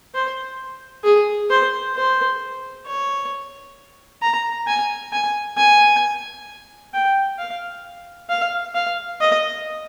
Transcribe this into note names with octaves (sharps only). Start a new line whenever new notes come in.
C5
G#4
C5
C5
C#5
A#5
G#5
G#5
G#5
G5
F5
F5
F5
D#5